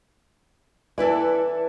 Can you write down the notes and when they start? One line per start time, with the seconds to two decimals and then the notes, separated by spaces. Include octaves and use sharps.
0.98 E3 E4 A4 B4 D5